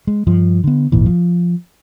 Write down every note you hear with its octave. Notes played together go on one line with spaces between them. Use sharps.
G#3
G2 F3
D3 B3
G#1 D#2 A#2 E3
F3